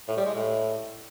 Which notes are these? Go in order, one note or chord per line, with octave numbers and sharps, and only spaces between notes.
A2
G3
G#3
A2